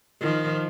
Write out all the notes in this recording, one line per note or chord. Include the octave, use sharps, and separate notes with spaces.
D#3 F3